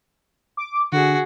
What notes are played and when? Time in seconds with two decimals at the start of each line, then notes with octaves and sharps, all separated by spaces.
0.57 D6
0.92 D3 F#4 G#4